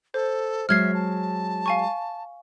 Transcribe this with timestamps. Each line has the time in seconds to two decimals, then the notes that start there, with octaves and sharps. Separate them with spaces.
0.14 A4 C5
0.69 F#3 G#3 E5 F6 G#6 C7
0.94 A5
1.66 F5 G#5 C#6